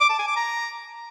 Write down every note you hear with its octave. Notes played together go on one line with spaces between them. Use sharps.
D6
A5
G#5
D6
A#5